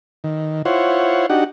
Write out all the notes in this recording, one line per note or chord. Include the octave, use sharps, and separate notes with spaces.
D#3
E4 F4 C5 C#5 F#5
D4 D#4 F#4 G4 F#5